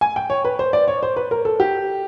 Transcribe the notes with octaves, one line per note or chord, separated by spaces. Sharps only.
G#5
G5
C#5
B4
C5
D5
C#5
C5
B4
A#4
A4
G4